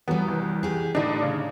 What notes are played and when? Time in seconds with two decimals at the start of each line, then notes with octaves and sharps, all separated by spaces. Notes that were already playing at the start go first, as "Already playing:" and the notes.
0.08 E3 F#3 G3 B3
0.28 C2
0.63 G4 G#4
0.95 A2 D3 D4 D#4
1.22 C#3